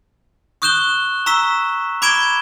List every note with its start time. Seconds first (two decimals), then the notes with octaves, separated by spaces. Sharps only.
0.62 C#6 D#6 F#6 G6 E7 G7
1.26 A#5 C#6 E6 B6 E7
2.02 B5 D6 G#6 D7 E7 G7